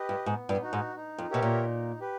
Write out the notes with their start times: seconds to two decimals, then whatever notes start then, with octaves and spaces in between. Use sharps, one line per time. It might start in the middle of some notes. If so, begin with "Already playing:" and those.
Already playing: G4 B4 D#5
0.09 G2
0.26 G#2 B3
0.49 G2
0.61 D#4 F#4
0.73 G#2
0.96 D#4
1.18 F2
1.30 B2 G4 A#4 C#5 E5
1.42 A#2
1.65 D#4
2.00 G4 B4